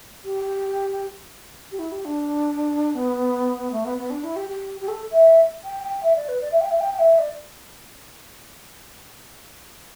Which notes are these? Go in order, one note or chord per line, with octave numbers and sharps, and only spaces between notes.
G4
G4
E4
G4
D4
B3
A3
B3
B3
D4
E4
G4
G4
G4
A4
E5
G5
G5
E5
D5
B4
D5
E5
G5
E5
G5
G5
E5
D5